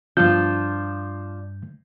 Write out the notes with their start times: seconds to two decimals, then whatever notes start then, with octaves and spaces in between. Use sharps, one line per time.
0.17 G2 F3 D4 F4 G6